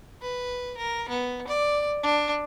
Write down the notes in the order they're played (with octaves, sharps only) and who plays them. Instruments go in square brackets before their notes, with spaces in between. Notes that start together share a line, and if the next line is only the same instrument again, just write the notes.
[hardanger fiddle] B4
A#4
B3
D5
D4